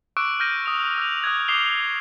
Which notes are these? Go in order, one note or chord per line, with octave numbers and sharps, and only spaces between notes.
C#6 D6 E6 F#6 D7
F6 G6 A#6 D#7
D#6 F7
E6 G6 F7
D#6 F#6 G#6
D6 D#6 C7 F7 G7